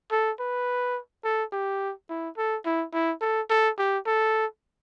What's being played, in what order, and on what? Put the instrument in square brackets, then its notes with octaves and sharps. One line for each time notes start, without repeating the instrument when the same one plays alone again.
[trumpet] A4
B4
A4
G4
E4
A4
E4
E4
A4
A4
G4
A4